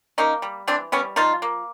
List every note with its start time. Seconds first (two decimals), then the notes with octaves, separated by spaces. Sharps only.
0.18 A#3 C#4 D#4
0.42 G3
0.67 E3 C4 D4
0.92 G3 B3 C#4
1.16 F3 D#4 F4
1.42 A#3